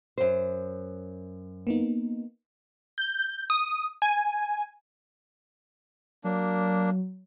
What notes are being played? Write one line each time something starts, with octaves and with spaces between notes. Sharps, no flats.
F#2 C5
A#3 B3 D#4
G6
D#6
G#5
F#3 A#3 D4